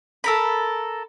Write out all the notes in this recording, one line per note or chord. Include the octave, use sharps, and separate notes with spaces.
A4 A#4 B5